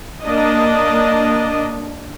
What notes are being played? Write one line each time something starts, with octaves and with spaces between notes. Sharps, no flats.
A#3 D4 D#5